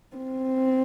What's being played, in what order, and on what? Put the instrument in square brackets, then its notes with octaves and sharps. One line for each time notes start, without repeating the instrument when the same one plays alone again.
[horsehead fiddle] C4